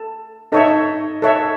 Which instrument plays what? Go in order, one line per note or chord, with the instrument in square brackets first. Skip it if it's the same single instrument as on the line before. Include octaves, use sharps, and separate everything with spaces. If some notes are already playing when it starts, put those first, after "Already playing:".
Already playing: [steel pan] A4
[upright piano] D#4 D#5 [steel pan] A4 C#5 E5
[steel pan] A4 C#5 E5